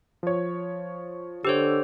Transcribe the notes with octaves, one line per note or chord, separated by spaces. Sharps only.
F3 C#5
D3 G4 C5 C#5 E6